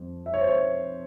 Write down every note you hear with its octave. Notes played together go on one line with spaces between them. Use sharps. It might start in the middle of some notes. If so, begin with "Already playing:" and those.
Already playing: F2
E5
C#5
C5
C#5